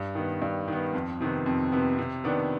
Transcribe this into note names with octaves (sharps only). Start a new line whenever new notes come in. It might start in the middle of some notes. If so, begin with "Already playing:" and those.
Already playing: G2
D#3 B3
G2
D#3 B3
F2
C3 D#3 B3
F2
C3 D#3 B3
C3
D#3 B3 D4